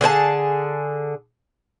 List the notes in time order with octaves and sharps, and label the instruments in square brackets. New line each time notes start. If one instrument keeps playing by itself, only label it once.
[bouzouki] D3 G#4 C5 A5